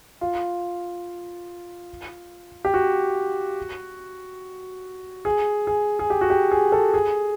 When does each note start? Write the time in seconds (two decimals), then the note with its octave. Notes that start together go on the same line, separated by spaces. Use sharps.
0.21 F4
2.65 G4
2.74 F#4
5.25 G#4
5.67 G#4
5.99 G#4
6.10 G4
6.21 F#4
6.30 G4
6.51 G#4
6.72 A4
6.94 G#4